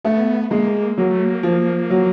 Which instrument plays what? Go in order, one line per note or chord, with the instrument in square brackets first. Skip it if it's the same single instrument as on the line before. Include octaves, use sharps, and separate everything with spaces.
[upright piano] A3 [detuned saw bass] B3
[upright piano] G#3 [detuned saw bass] A#3
[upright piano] F#3 [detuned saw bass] A#3
[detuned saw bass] A3
A#3
[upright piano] F3
F#3